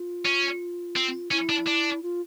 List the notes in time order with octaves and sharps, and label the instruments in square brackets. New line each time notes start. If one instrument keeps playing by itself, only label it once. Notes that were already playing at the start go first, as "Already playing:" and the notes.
Already playing: [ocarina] F4
[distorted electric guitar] C#4
C4
[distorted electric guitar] C#4 [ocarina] E4
[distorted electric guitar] D4
D4
[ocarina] F4